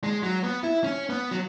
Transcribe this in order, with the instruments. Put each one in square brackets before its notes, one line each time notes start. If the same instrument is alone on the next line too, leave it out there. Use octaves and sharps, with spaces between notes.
[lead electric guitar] G#3
F#3
B3
E4
C#4
B3
F#3